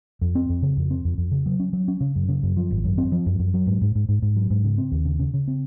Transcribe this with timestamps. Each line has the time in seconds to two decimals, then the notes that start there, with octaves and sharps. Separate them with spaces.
0.22 F2
0.35 C4
0.49 F2
0.62 C#3
0.77 F2
0.90 C4
1.05 F2
1.18 F2
1.32 C#3
1.46 F#3
1.60 C#4
1.73 F#3
1.88 C#4
2.01 C#3
2.16 F#2
2.29 C#3
2.43 F#2
2.56 F3
2.71 G#1
2.84 F#2
2.98 C4
3.12 F3
3.26 F#2
3.39 F#2
3.54 F#3
3.67 G#2
3.81 G#2
3.95 G#2
4.09 G#2
4.22 G#2
4.36 F#3
4.50 G#2
4.64 C#3
4.78 C4
4.92 D#2
5.05 C#3
5.19 C#3
5.34 C#3
5.48 C4